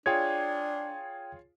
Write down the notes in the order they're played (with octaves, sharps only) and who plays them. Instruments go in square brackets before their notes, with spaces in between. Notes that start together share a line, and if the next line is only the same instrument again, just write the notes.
[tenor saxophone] D4 [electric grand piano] F4 G#4 C#5 [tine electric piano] G5 G#6